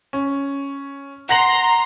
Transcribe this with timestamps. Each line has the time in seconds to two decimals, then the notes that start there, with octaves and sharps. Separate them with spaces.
0.13 C#4
1.29 F#5 A#5 C6 A#6 F#7